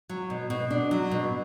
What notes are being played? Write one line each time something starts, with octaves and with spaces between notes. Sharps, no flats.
F#3
B2
B2
D4
F#3
B2